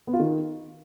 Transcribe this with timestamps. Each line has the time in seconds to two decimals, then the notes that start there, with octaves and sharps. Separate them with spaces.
0.07 B3
0.13 F4
0.19 D#3